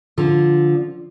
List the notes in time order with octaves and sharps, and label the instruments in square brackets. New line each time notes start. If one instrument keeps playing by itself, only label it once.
[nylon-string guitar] D3 F3